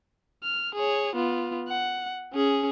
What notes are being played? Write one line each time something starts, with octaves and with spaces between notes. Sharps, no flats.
F6
G#4 C#5
B3 F4
F#5
C#4 G#4